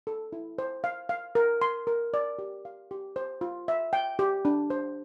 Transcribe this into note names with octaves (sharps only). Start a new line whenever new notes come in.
A4
E4
C5
F5
F5
A#4
C6
A#4
D5
G4
F5
G4
C5
F4
E5
G5
G4
D4
C5